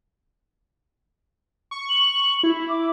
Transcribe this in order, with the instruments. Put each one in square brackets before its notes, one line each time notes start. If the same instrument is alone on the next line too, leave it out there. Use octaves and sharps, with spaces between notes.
[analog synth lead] C#6
[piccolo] F#7
[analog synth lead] E4
[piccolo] D6